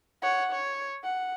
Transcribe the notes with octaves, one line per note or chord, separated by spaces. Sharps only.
C#5 F#5
C#5
F#5